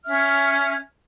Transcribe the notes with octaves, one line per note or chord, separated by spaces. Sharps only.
C#4 E5 F6